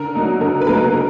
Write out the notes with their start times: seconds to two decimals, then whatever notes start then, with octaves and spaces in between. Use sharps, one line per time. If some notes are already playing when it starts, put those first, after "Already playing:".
Already playing: D3 A#4
0.15 F#3 A#3 D#4
0.41 D3 A#4
0.61 B4
0.67 F#3 A#3 D#4 A#4
0.83 B4
0.94 A#4